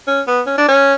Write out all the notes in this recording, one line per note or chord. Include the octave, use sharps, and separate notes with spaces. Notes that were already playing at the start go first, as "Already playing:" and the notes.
C#4
B3
C#4
D4
C#4